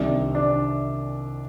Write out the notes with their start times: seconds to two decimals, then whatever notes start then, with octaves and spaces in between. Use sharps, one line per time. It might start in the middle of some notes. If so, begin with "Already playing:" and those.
Already playing: C2 C3 D#3 D4
0.35 D4